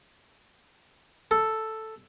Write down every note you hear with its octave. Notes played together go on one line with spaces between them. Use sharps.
A4